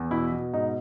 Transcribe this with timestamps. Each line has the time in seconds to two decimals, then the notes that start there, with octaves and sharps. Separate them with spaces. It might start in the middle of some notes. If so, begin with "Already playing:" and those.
Already playing: E2
0.11 B2 E4
0.32 B2
0.53 G#2 D#4